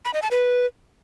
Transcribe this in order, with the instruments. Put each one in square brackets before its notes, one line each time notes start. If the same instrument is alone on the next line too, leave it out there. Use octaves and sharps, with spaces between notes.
[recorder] B5
D#5
A5
B4